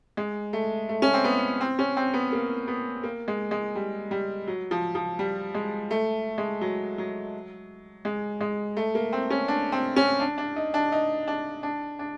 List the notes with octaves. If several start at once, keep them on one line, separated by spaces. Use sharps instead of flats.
G#3
A3
A3
C#4
C4
B3
C4
C#4
C4
B3
A#3
B3
A#3
G#3
G#3
G3
G3
F#3
F3
F3
G3
G#3
A3
G#3
F#3
F#3
G#3
G#3
A3
A#3
C4
C#4
D4
C4
C#4
D4
D4
D#4
D4
D#4
D4
D4
D4